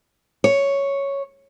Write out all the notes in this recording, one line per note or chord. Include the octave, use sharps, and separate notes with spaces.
C#5